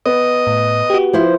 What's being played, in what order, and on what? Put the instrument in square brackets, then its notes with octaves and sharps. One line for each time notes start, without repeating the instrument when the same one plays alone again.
[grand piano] B3 [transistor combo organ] D#5
[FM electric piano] A2
F#4 G4
[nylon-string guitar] F3 E4 C5